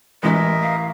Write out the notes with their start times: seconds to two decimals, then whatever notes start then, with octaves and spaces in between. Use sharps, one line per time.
0.23 A1 E3 G#3 A#4 D#5 E5 B6
0.62 F5